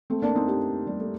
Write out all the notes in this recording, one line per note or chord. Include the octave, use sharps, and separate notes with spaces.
A3 C4
A#3 D4
C4 D#4
D#4 G4
G3
A3